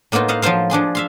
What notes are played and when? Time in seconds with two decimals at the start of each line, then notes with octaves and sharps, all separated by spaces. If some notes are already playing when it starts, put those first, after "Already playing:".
0.12 A2 A#3 B3 D#4 F4
0.28 C5 D#5 F5 F#5
0.42 F3 F#3 F4 C5 F5
0.70 F3 D4 G#4 C6
0.95 E5 F5 C6